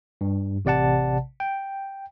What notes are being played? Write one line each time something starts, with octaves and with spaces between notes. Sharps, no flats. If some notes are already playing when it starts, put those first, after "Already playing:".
G2
A1 C3 D5 F#5 A5
G5